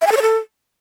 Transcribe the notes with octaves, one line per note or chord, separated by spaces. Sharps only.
E5
G#5
A4
C#5
A4